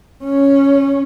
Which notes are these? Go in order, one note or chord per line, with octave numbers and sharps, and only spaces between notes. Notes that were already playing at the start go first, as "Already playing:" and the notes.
C#4